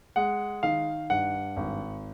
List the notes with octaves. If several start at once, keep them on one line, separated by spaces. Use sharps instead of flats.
G#3 F#5
D#3 F5
G2 F#5
G#1